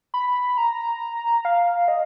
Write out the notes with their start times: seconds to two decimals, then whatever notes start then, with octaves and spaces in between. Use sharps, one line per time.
0.14 B5
0.58 A#5
1.45 F5
1.88 D#5